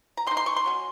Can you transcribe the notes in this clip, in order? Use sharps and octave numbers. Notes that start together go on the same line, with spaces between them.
A#5
C3 D#3 G#3 D#4 C6
C6
C#6
C6
F#3 C#4